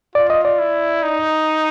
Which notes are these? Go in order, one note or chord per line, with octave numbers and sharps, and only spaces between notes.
F4 D5
D#5
D5
E4
D#4